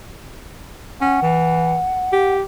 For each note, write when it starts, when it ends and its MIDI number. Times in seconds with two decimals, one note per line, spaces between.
1.01 1.21 61
1.01 2.35 78
1.22 1.79 52
2.12 2.42 67